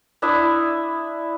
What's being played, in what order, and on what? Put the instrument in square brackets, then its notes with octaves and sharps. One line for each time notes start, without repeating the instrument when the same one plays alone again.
[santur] D4 E4 E5 D#6